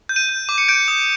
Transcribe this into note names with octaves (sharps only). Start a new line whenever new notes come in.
G6
D#7
G6
D6
C#7
G6 D7
D#6